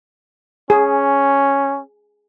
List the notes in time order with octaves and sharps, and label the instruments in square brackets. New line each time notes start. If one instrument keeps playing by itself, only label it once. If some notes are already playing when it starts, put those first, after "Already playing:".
[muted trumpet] C#4 [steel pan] G#4